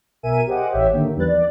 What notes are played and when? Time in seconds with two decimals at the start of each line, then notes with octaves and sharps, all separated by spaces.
0.23 B1 A#4 E5 G#5 D#7
0.47 G4 G#4 C5 D#5 F#5 D6
0.70 A1 G4 C#5 E5 G5
0.93 D3 D#3 A#3
1.15 E2 F3 G3 B4 F#6 A6
1.27 D5